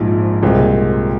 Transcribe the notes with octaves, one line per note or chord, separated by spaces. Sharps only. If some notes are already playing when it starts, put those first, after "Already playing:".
Already playing: A#1 G#2 F3
C2 A#2 G#3 C4